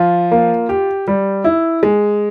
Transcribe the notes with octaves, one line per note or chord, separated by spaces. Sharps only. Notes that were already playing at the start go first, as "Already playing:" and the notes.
Already playing: F3 F4
A#3
G4
G3
E4
G#3